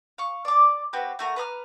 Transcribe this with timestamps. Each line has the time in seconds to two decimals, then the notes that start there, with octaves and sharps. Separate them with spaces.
0.18 F5 C#6
0.45 D5 D6
0.93 C4 F#4 G4 B4
1.19 A3 F#4 A#4
1.36 B4 A#5 D#6 F6